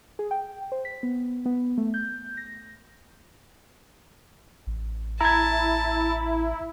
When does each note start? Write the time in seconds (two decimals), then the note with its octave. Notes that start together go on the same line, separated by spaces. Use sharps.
0.19 G#4
0.31 G5
0.72 C5
0.85 B6
1.03 B3
1.46 B3
1.78 A3
1.94 G6
2.37 A#6
4.67 A1
5.21 E4 A5 A#5 G#6